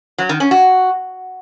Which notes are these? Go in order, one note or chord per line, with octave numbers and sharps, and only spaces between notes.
F#3
D#3
C#4
F#4